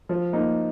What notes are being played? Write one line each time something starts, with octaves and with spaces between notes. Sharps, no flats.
F3
A#3 D#4